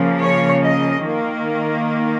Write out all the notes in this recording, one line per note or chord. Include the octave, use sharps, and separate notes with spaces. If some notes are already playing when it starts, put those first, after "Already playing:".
Already playing: C#3 F3 A#3
C#5
D#5
D#3 A#3